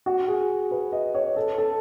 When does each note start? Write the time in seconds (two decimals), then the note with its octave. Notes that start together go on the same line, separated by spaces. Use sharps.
0.06 F#4
0.28 G#4
0.71 B4
0.92 D#5
1.14 C#5
1.36 A4
1.58 A4